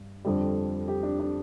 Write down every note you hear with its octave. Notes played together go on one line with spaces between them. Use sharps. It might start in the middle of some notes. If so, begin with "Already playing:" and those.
Already playing: G2
F2 D3 G3
G4
D4
D4